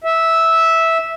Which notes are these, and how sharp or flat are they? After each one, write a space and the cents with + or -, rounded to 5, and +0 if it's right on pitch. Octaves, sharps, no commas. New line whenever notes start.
E5 -10